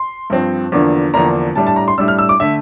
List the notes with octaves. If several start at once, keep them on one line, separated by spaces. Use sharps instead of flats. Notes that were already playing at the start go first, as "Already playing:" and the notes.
Already playing: C6
G2 F3 C4
E2 D3 F3 A#3 D4
E2 D3 F3 A#3 D4 A#5
A2 G3 D4 A5
A5
A#5
C6
A2 G3 D4 E6
F6
E6
D6
D3 A3 E5